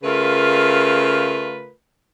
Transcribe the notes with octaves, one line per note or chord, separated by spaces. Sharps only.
C#3 A3 F4 A#4 B4